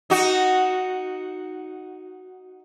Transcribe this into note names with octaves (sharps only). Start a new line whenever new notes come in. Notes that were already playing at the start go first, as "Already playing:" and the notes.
D#4 F#4